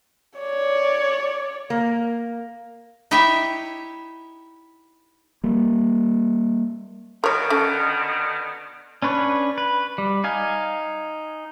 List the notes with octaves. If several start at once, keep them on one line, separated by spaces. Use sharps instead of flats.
C#5 D5
A#3
D#4 E4 G4 C#5 E5
G3 A#3
B2 D3 D#3 A#4 C#5
C#4 A4
C#4 D4 B4 C#5
B4
G3
D#4 F5 G#5